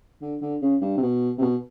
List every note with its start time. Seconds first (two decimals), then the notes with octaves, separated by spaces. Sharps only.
0.22 D3
0.41 D3
0.62 C#3
0.81 G2
0.97 C3
1.02 B2
1.38 C3
1.41 B2